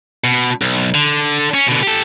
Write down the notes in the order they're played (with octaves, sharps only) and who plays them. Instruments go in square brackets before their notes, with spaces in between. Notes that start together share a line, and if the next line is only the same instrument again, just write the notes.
[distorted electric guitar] B2
B1
D3
C#4
B2 D3
G4 A4